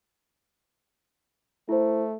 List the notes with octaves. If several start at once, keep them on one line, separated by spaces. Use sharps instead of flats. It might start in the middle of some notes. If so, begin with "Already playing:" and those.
A3 E4 C5